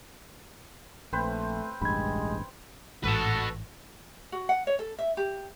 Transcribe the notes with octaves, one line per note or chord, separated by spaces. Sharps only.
A#1 A3 C4 B4 C5
E1 A1 G2 G#3 B5 G#6
A1 G#2 F#4 A4 B4 A5
F#4
F#5
C#5
A4
E5
G4